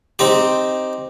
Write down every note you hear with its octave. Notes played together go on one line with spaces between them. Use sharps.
C4 D#4 G4